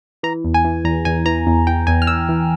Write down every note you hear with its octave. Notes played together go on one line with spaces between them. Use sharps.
E3 A#5
E2
G#5
E3
E2 A#5
E2 G#5
E3 A#5
E2
E2 G5
E2 G#5
F6
E2 E6
E3